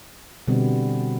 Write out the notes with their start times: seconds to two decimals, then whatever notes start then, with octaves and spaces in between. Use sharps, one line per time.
0.48 B2 D3 G3 B3 C4